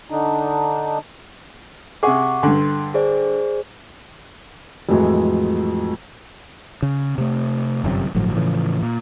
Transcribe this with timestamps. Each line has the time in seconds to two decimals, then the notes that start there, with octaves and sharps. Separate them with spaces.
0.10 D3 D4 D#4
2.03 C3 G#4 F#5 C#6 D6
2.43 G2 D3 C6
2.94 G#4 C5 D5
4.89 F2 A2 E3 F#3 G#3
6.82 C#3
7.18 C3 A3
7.84 G1 F#2 C3
8.15 G1 A2 F3 F#3
8.36 A2 C#3 E3 F3
8.82 A#2